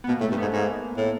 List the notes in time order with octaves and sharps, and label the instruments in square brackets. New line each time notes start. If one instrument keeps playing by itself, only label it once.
[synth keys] B3
[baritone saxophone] B2 [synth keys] A#3
[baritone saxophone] A2
[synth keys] A3
[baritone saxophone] G2
[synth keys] B3
[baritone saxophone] G#2
[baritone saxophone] G#2 [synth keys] A#3
[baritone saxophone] A2